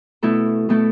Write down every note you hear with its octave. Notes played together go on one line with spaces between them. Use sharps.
B2 A3 E4 A4
B2 A3 E4 A4